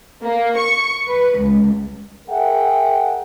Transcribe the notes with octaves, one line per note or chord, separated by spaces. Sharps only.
A#3
C#6
B4
C#2
G#4 A#4 E5 F#5 G5